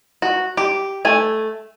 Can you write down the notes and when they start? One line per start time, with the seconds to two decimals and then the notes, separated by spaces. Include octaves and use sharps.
0.22 F#4
0.57 G4
1.05 A3 G#5